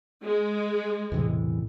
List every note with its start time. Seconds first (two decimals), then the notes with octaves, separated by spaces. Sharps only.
0.23 G#3
1.12 B1 E2 A2 C3 E3